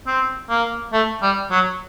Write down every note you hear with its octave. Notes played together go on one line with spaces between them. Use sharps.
C4
A#3
A3
G3
F#3